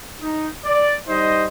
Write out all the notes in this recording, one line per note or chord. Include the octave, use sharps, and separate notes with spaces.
D#4
D5
G3 D#4 C5 D#5